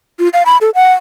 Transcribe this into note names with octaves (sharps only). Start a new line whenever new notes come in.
F4
F5
B5
A4
F#5